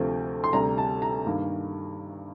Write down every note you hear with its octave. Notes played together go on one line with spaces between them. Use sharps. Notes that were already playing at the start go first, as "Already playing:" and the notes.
Already playing: D2 C3 F3 A3 C4
C6
D2 C3 G3 A#5
A5
A#5
G2 D#3 A#3